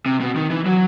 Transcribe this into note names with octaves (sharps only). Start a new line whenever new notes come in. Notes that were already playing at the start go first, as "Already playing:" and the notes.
C3
B2
D#3
E3
F#3